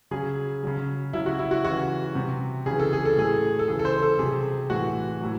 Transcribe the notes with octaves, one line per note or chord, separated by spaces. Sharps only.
C#3 F#3 G#4
C#3 F#3
C#3 F#3 E4
F#4
E4
F#4
C#3 E3 F#4
C3 F#3
C#3 E3 G#4
A4
G#4
A4
A2 F#3 G#4
A4
C#3 E3 G#4
A4
C5
A4
C3 F#3 G#4
A2 E3 F#4
A2 F#3